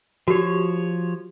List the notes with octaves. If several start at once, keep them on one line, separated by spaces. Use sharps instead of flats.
F3 F#4 G4 C#5